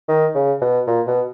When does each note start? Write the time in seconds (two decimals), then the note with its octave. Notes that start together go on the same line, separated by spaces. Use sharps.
0.09 D#3
0.35 C#3
0.61 B2
0.87 A#2
1.07 B2